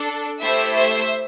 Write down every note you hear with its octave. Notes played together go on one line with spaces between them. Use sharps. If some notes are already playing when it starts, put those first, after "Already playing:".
Already playing: D4 A4
A3 E4 G4 C5 E5
C5 E5